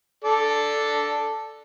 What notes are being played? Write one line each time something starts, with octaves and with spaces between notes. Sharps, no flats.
A4 D5